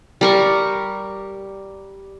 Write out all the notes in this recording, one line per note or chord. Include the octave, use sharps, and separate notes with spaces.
G3 A#4 C#6